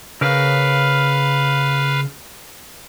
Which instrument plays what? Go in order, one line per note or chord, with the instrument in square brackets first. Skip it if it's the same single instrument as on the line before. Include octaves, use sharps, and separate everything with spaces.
[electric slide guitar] C#3 A#4 [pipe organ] B4 F5